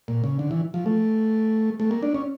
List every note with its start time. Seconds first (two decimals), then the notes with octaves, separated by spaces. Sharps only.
0.08 A#2
0.24 C#3
0.39 D3
0.51 E3
0.74 F3
0.86 A3
1.80 A3
1.91 A#3
2.03 D4
2.14 C#4